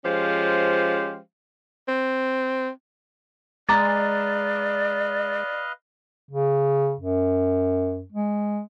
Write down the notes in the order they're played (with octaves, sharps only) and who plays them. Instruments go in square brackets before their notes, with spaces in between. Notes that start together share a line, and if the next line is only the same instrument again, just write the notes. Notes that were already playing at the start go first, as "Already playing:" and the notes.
[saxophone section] F3 G#3 C#4 G4 C5 F5
[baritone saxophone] C4
[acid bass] G#3 [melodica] B4 D#5 F5 [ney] D5 [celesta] A#5 D6 A6
[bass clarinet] C#3
F#2
G#3